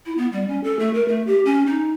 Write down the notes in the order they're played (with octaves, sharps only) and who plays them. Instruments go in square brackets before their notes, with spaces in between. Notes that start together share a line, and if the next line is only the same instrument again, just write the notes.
[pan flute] E4
B3
G3
C#4
A4
A3
A#4
A3
G4
C#4
D#4